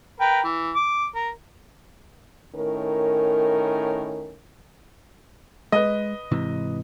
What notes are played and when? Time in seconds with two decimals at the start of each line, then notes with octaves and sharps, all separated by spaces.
0.20 A#4 B4 G5
0.44 E3
0.75 D6
1.15 A#4
2.55 A2 D#3 C#4 A#4
5.72 G#3 B4 D#5
6.31 G#2 C3 E3